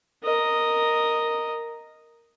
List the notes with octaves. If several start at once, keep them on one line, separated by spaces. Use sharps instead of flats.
A#4 D#5